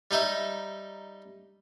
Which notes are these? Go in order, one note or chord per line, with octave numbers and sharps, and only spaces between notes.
G3 D#4 D#5 E5